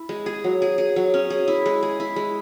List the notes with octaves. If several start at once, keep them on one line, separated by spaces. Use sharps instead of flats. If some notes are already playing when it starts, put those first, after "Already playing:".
Already playing: E4
G#3
G#4
F#3
G#4
G#4
F#3
C#4
G#4
E4
G#3
G#4
E4
G#3